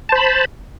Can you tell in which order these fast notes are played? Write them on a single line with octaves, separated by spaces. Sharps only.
A5 C5 B5